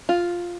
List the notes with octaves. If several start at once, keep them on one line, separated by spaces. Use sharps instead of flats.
F4